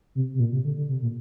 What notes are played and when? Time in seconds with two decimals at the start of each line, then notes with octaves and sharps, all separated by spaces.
0.15 C3
0.35 C3
0.40 A#2
0.53 C3
0.65 D3
0.77 D3
0.89 C3
1.02 A#2